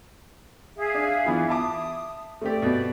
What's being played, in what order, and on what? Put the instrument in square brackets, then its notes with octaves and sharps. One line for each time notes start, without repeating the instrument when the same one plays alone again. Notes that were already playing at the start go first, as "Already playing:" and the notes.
[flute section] G#4 E5 F5
[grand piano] D4
E3 B3 F4
[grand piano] E5 A5 D6 [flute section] D#6
[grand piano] A3 C4 G4 [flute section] D5
[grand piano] B2 B3